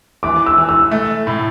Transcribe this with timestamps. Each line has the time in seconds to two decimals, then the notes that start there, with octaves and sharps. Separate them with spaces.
0.23 E3 D6
0.46 E6
0.58 E3
0.69 E6
0.91 A3
1.27 A2